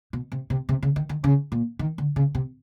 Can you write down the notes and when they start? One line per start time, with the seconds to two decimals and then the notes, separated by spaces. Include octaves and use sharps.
0.13 B2
0.32 C3
0.50 C3
0.69 C3
0.83 C#3
0.96 D#3
1.09 D#3
1.24 C#3
1.52 A#2
1.79 D#3
1.98 D3
2.16 C#3
2.35 C3